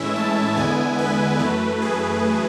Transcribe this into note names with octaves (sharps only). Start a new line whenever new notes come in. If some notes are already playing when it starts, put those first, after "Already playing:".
Already playing: A2 E3 G#3 C#4 E4 E5
A5
E2 D3 G#3 B3 E4 G#5
B4
F#2 E3 A3 B4
G#4